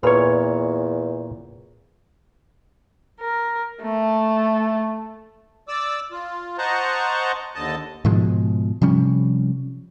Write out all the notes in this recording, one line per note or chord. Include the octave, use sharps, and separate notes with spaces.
E2 A#2 A4 B4 C#5 B5
A#4
A3
D5 D6 E6
F4
C5 D#5 F#5 A5 A#5 C#6
D#2 D3 D#5 A5
G#2 B2 F3 G#3
C3 F3 G3 C#4